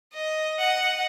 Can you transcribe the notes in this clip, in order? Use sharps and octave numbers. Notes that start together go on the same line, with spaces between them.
D#5
D#5 F#5